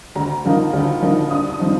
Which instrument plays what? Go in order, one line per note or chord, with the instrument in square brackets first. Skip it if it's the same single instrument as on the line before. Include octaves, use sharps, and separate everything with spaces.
[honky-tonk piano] D2 A#5
D3 F3 A#3 D#4
D2
D3 F3 A#3 D#4
G2 D#6
D#6
F3 C4 D#4